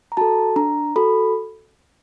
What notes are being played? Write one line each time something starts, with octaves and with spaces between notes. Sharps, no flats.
A#5
F#4 A4 A5
D4 A#5
F#4 A4 B5